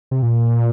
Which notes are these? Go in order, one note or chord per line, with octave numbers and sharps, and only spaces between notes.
C3
A#2